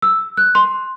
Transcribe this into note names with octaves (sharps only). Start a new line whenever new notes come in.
E6
F#6
C6